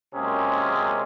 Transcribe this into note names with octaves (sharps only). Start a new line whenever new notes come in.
F#2 C3 G#3 A#3 C#4 G#4